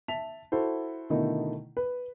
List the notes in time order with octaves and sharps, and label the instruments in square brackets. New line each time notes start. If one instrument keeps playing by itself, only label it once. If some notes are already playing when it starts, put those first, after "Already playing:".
[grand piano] E5 A5 B6 F7
E4 F#4 A4 C5
B2 D3 D#3 A3 D#4 E4
B4